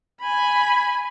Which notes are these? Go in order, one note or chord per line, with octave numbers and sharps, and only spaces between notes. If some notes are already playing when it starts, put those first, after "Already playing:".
G#5 B5